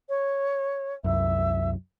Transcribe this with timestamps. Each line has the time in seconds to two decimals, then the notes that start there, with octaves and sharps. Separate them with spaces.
0.09 C#5
1.04 C2 F#2 E5